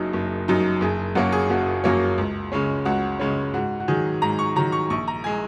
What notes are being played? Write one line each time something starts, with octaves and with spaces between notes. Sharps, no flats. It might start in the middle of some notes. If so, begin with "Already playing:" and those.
Already playing: F#1 F#2 F#3 D#4 G#4
F#1
F#2 F#3 D#4
F#1 G#4
F#2 F#3 A#3 C#4 F#4
G#4
F#1 F#4
F#2 F#3 A#3 C#4
C#2
C#3 G#3 C#4
C#2 F#4
C#3 G#3 C#4
G#2 F#4
F#4
D#3 F#3 G#4
G#2 A#5
C#6
D#3 F#3 A#5
C#6
A#1 C#6
A#5
G#3 G#5